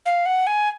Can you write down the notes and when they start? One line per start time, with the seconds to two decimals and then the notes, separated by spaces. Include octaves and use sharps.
0.06 F5
0.26 F#5
0.47 G#5